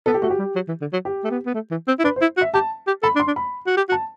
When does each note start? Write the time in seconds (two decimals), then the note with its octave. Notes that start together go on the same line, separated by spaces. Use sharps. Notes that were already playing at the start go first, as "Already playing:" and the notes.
0.06 B3 A4
0.14 G4
0.22 A3 F#4
0.30 G4
0.39 G3
0.56 F#3
0.68 E3
0.81 D3
0.93 F#3
1.05 G4
1.24 A3
1.31 B3
1.46 B3
1.54 A3
1.71 E3
1.88 C4
1.99 E4
2.04 D4 B4
2.16 C5
2.21 E4
2.37 F#4
2.41 E5
2.54 G4 A5
2.87 G4
3.03 A4 B5
3.16 D4
3.20 C6
3.27 D4
3.36 B5
3.67 F#4
3.77 G4
3.89 F#4
3.92 A5